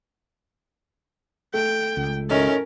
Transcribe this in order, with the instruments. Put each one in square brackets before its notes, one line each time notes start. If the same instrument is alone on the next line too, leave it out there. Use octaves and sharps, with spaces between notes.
[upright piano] A3 [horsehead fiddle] G5
[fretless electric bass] C#2
[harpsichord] F#2 A2 D#3 [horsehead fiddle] C#4 A#4